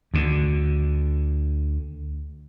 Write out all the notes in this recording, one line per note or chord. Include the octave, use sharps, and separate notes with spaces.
D2 D3